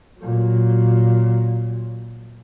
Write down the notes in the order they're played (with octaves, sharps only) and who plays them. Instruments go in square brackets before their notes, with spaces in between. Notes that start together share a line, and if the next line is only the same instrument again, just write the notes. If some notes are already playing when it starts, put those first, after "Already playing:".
[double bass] A#2 F#3